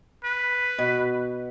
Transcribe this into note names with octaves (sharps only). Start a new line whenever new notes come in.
B4
B2